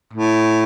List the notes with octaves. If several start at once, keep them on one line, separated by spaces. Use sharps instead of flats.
A2